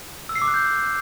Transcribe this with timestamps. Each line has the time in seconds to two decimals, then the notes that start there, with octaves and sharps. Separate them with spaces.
0.29 E6
0.35 C7
0.42 D6
0.48 F#6
0.54 G6